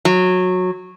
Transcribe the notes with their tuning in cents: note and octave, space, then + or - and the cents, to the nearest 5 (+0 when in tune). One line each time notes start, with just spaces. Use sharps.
F#3 -15